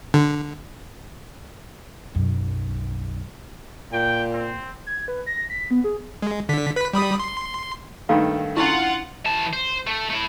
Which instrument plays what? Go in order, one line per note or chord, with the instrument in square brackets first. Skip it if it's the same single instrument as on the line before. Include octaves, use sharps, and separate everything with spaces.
[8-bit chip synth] D3
[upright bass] B1 F#2
[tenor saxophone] A#2 [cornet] G5
[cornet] C4
[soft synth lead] G#6
B4
A#6
B6
B3
G#4
[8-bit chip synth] G#3
D3 B6
B4 B6
G3 B5 D#6
C6
[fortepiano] G2 D#3 A3 [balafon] A#3 D#4 [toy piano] F5
[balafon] C#4 D4 C#6 [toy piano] E4 [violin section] F4 F#5
[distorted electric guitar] E3 A5
C5
A3
A3 E4